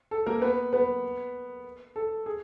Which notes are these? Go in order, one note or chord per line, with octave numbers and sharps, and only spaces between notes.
A4
A#3 A#4
B3 B4
B3 B4
A4
G#4